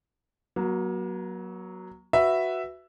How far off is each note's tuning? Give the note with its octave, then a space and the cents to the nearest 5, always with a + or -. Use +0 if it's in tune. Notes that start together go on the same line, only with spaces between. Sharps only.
F#3 +0 A#3 +40
F#4 +0 B4 +0 E5 +5